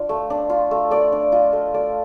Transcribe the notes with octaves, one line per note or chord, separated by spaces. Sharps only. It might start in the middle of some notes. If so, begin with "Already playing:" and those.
Already playing: D4 F4
A3
D4
F4
A3
A3 D5
D4
F4 D#5
A3
A3 D5